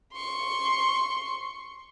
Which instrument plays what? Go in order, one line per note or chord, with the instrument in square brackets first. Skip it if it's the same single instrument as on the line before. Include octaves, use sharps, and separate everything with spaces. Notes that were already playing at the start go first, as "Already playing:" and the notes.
[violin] C6 C#6